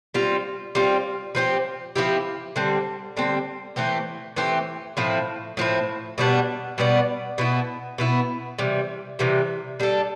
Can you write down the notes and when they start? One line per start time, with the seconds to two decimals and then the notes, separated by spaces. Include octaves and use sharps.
0.14 G3 C4 F4
0.75 G3 C4 F4
1.35 F3 C4 E4 G4
1.96 F3 C4 E4 G4
2.56 D3 G3 C4
3.17 D3 G3 C4
3.76 E3 A3 C4 G4
4.36 E3 A3 C4 G4
4.97 A2 F3 C4 E4
5.57 A2 F3 C4 E4
6.18 B2 G3 B3 D4
6.78 B2 G3 B3 D4
7.38 B2 B3 E4
7.98 B2 B3 E4
8.58 C3 E3 G3
9.19 C3 E3 G3
9.80 G3 D4 A4